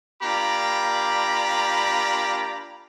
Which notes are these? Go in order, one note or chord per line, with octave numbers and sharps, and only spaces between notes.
A#3 D4 F4 G4 A#5 B5